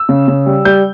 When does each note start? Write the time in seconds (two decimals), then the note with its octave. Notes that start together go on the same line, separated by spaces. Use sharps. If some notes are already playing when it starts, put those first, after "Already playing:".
Already playing: E6
0.09 C#3
0.28 C#3
0.46 G3
0.65 G3 G6